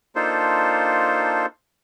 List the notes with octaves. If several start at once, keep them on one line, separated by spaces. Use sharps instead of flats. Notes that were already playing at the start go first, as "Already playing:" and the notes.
A#3 D4 D#4 F4 A4 C5